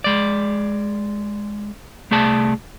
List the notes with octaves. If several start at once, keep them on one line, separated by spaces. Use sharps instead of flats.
G#3 D5
C2 A3 G#4 D5 A5